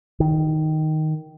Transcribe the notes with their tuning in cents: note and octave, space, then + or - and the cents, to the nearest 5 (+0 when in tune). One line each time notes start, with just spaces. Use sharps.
D#3 +0